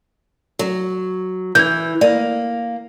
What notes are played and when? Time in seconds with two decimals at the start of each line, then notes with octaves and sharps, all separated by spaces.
0.59 F#3
1.55 E3 G6 G#6
2.01 A#3 D5